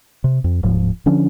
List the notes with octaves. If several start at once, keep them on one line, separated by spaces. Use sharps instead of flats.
C3
F2
D1 G#2 F3
D3 F3 C#4 D4